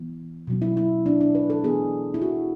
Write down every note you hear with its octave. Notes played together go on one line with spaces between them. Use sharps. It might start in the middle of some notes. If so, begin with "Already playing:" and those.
Already playing: E3 B3
B2 F#3 C#4
E4
E4
D4
D4
B4
A4
E3 B3 G#4
E4
F#4